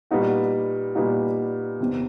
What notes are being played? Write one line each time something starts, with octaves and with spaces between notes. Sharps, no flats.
A#2 G3 B3 D#4 F#4
A#2 G3 B3 D#4 F#4
E1 E2 C3 D#3